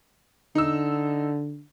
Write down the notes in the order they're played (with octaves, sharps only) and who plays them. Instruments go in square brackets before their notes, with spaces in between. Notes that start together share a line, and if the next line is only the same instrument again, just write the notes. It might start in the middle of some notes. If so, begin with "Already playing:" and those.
[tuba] D3 [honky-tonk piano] D#4 E6